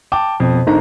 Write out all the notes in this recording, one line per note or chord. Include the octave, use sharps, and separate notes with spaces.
G5 A5 D6
F2 B2
B2
G#1 D3 D#4 A#5